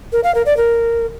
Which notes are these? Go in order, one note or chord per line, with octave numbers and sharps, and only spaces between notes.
A#4
F5
A#4
D5
A#4